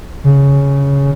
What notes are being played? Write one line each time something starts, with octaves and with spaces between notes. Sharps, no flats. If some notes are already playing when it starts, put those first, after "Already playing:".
C#3